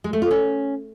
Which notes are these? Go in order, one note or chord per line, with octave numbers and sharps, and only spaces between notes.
G#3
A3
F4
C#4